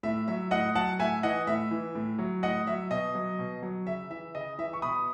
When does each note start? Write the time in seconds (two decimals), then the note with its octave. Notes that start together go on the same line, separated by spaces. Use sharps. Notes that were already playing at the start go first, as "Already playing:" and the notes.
0.03 A2 E5
0.28 F#3 E5
0.51 A2 D#5 F#5
0.75 F#3 F#5 A5
0.99 A2 E5 G#5
1.23 E3 D#5 F#5
1.47 A2 E5
1.71 E3
1.95 A2
2.19 F#3
2.43 A2 D#5 F#5
2.67 F#3 E5
2.91 B2 D#5
3.15 F#3
3.39 B2
3.62 F#3
3.87 C#3 E5
4.11 E3 E5
4.35 C#3 D#5
4.58 E3 E5
4.73 C#6
4.82 B2 B5 D#6